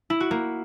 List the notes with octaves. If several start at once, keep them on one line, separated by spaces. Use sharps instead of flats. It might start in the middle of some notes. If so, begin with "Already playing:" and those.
E4
F#4
A#3